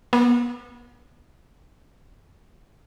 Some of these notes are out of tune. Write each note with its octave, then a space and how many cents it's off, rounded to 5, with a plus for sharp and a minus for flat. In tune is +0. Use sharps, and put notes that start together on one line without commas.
B3 -35